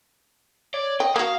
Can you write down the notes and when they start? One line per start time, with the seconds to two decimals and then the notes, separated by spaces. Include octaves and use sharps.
0.74 C#5 D5
1.00 D#5 G5
1.16 A#3 F#4 F5 D#6